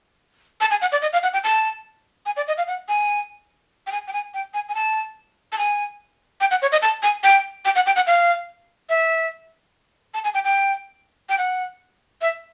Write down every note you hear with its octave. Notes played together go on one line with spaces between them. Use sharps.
A5
G#5
F#5
D5
D#5
F5
F#5
G5
A5
G#5
D5
D#5
F5
F#5
G#5
G5
G#5
G5
G#5
G5
G#5
G#5
A5
A5
G#5
G5
F#5
C#5
D#5
A5
G#5
G5
G5
F#5
G5
F#5
F5
E5
A5
G#5
G5
G5
G5
F#5
E5